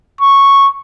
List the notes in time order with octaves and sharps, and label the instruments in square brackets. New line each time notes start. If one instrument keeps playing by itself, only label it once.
[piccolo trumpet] C#6